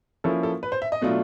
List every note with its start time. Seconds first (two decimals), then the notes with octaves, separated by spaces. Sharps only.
0.24 F3 A#3 C#4 E4 A4
0.43 A4
0.63 B4
0.72 C5
0.82 E5
0.92 D#5
1.02 B2 F#3 A3 D4 F4